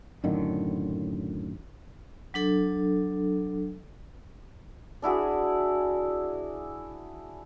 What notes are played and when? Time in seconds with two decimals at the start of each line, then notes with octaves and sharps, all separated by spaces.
0.24 F#2 A2 D3 D#3
2.34 F#3 D4 A4
5.02 D4 E4 F#4 G#4